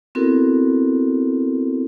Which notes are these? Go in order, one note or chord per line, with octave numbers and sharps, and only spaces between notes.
B3 C4 E4 F#4 A4 A#4